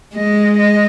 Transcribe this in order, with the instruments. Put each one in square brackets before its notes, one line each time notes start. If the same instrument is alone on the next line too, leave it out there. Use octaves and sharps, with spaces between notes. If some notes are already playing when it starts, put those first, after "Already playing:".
[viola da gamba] G#3 [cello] D#5
[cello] D#5